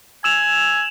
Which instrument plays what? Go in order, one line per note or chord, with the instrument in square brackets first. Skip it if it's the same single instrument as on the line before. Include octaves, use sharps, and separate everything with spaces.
[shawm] G#5 [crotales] E6 E7 F7